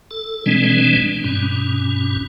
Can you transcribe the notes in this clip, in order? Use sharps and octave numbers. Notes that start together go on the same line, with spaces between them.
A4
B2 E3 G3 G#3 C4 D4
G2 B2 C#4